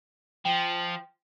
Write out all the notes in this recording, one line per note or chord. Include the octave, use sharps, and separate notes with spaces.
F3 G5